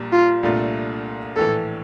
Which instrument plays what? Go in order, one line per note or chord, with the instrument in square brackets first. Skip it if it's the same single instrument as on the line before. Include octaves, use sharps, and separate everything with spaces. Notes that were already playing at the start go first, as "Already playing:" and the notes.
Already playing: [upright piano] A#1 A#2 G3
[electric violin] F4
[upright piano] C2 A#2 A3 D4 F4
[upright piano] A#1 A2 E3 [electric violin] A4